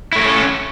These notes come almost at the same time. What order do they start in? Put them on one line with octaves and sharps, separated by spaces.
E4 A3 A#4 A4 C#4